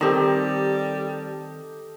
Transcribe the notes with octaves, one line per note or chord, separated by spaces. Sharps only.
D#3 G3 C4 G4 A4 D#5